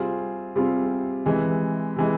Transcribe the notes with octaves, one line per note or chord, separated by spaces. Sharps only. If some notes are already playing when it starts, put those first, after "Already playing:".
Already playing: C3 G3 C4 F4 G#4
C3 G3 C4 F4 G#4
C3 E3 G#3
C3 E3 G#3